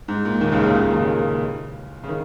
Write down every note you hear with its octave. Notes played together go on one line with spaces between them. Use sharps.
G#2
A#2
D#2 D#3
C#2 C#3
D#2 D#3
C#2 C#3
A#2
D#2 D#3
C#2 C#3
A#2
A#2
C#3
D#3